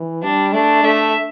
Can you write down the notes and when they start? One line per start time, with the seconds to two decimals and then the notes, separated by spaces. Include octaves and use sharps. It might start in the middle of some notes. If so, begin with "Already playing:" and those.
Already playing: E3
0.23 G3 D4
0.53 A3 D4
0.84 A3 E5